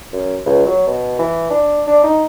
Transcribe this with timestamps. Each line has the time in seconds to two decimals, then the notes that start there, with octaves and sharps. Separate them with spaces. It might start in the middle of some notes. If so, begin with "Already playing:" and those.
0.13 F#2
0.46 C#2
0.66 F#3
0.87 B2
1.19 E3
1.50 D4
1.87 D4
2.03 D#4